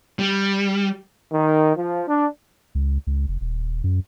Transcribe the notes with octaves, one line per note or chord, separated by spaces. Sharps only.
G3
D#3
F3
D4
C#2
C#2
F1
D#1
F#2